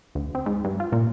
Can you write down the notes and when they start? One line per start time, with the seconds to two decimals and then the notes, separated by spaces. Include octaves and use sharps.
0.15 D2
0.35 C4
0.46 G#2
0.65 G2
0.80 F4
0.92 A#2